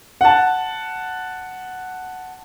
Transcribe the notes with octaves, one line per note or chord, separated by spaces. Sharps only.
F#5 A5